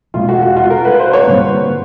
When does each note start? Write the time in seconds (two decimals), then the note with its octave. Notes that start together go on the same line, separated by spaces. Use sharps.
0.14 E2 B2 G#3 F4
0.29 F#4
0.42 F#4
0.56 F4
0.70 A#4
0.85 B4
1.00 C5
1.13 C#5
1.27 G2 D3 G3 A#3